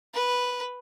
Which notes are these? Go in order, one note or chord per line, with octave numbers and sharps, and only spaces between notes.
B4